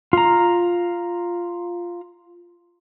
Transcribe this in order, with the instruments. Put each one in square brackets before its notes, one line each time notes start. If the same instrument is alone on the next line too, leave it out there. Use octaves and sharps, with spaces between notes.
[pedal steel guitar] F4 A#5